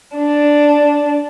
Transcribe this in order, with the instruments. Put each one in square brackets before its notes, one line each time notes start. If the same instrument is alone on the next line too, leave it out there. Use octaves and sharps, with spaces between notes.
[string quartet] D4